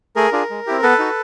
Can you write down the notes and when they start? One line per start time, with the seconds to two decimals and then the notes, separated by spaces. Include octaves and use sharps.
0.16 A3 G#4 A#4
0.32 D4 F4 G#4
0.50 G#3
0.67 C4 E4 G4
0.82 B3 A4 B4
0.99 D#4 F#4